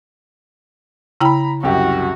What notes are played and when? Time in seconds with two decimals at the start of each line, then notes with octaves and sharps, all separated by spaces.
1.20 C#3 E4 G5 A#5 B5
1.63 C2 F#2 F#4 G4